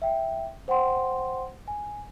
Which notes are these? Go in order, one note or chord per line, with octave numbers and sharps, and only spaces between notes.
E5 G5
C5 F#5 G5 C6
G#5